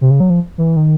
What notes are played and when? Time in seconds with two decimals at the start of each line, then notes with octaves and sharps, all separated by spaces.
0.01 C3
0.11 C#3
0.20 F#3
0.30 F3
0.58 E3
0.76 D#3